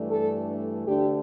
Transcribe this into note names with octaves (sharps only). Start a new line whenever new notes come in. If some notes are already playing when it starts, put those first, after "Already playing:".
Already playing: G2 E3 A3 D4
A4
D2 D3 A3 D4 G4